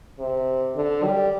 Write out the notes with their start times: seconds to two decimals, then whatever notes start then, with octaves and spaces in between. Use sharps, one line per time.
0.19 C3
0.75 D3
1.04 G3